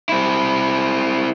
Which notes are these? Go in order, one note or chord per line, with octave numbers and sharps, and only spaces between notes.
C4 E4